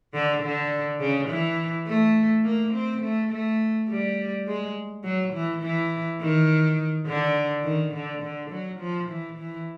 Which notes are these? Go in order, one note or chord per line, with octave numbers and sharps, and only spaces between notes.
D3
D3
C#3
E3
A3
A#3
C4
A3
A3
G3
G#3
F#3
E3
E3
D#3
D3
D#3
D3
D3
F#3
F3
E3
E3